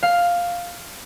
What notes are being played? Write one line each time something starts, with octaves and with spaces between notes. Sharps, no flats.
F5